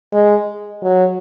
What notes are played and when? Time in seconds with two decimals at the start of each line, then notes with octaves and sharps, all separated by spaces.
0.13 G#3
0.83 F#3